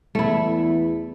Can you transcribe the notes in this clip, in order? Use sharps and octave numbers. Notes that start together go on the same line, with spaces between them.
E2 A3 E4